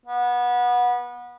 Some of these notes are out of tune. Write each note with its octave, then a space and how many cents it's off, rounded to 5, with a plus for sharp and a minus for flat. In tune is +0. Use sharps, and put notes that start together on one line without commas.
B3 -25